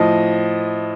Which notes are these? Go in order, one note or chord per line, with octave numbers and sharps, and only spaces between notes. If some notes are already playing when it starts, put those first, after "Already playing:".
Already playing: A2 F3 D#5